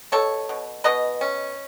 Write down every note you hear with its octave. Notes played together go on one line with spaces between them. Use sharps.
B2 A4 C#5
B2
B2 B4 D#5
C#4